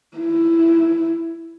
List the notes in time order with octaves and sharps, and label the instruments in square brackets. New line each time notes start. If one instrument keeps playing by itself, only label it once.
[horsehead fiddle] E4